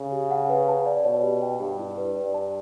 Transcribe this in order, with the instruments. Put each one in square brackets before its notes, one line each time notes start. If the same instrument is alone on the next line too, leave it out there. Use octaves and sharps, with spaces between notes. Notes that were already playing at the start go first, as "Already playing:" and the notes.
Already playing: [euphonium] C#3
[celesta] G4
F#5
B4
A5
D5
[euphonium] B2 [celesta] C#5
[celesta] G4
G5
[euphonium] G2 [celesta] G4
[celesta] E4
B4
[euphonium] G2 [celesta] D5
[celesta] A5